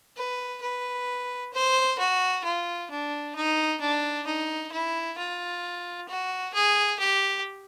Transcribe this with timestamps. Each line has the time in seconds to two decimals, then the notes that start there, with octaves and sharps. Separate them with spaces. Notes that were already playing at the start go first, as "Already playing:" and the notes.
0.17 B4
0.62 B4
1.53 C5
1.99 F#4
2.44 F4
2.90 D4
3.35 D#4
3.81 D4
4.27 D#4
4.72 E4
5.18 F4
6.09 F#4
6.54 G#4
6.99 G4